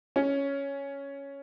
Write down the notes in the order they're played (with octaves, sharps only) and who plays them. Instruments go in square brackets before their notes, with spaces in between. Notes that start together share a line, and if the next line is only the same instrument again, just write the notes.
[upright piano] C#4